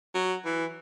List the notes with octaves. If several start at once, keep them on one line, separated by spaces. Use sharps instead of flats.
F#3
E3